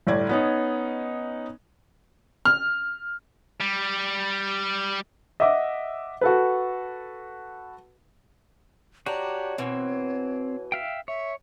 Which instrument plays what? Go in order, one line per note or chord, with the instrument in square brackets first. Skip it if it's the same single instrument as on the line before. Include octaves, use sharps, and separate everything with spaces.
[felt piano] G1 A2 D5 G#6
B3 C#4 D#4
[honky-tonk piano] F6
[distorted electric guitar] G3
[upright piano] D#5 E5 F#5 D6
F#4 A4 B4
[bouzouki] D4 [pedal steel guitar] F#4 G4 A#5 [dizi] C#5
[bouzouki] B2 E3 [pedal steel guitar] C4
[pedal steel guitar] E5 F5 G5
[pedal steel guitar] C#5 [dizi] E5